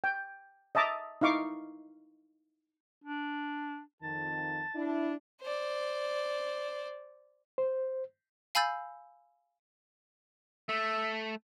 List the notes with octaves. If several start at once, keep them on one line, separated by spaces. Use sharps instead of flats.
G5
D#5 E5 A5 A#5 D6
D#4 E4 F5 C#6 D6
D4
F2 D#3 A5
D4 E4
C5 D5
C5
F5 G#5 B5 E6 G6 A6
A3 E5